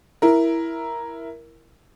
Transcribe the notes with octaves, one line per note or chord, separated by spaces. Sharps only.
E4 A#4